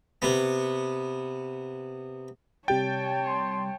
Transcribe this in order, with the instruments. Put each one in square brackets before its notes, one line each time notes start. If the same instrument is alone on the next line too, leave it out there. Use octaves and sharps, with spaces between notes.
[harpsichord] C3 B3
[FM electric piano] C3 G3 A6 [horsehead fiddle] C#5 A5 [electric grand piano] G5
[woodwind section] C6